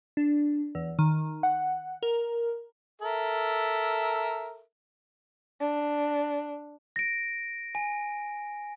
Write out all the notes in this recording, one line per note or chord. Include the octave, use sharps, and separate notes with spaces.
D4
E2
D#3
F#5
A#4
A4 A#4 E5
D4
A#6 D7
G#5